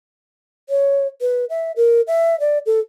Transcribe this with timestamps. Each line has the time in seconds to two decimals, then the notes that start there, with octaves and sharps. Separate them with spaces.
0.69 C#5
1.21 B4
1.50 E5
1.76 A#4
2.07 E5
2.40 D5
2.66 A4